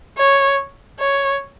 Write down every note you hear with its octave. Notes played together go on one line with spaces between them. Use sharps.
C#5
C#5